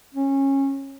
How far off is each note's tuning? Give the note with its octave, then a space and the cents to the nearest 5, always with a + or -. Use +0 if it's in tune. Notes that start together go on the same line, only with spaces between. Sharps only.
C#4 -20